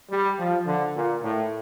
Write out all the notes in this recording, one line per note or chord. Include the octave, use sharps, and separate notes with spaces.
G3
F3
D3
A#2
A2